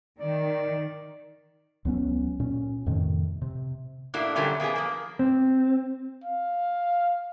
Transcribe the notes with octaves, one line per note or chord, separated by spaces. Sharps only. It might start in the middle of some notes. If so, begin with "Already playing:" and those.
D#3 D5
C#2 F#3 B3 C#4
A#2 C#4
F2 A2 C3 D#3
C3
A2 A#3 D4 E4 F#4
F2 A#2 D3 F#3 G3 C#4
A#3 B3 G4 G#4
F3 A#3
C4
F5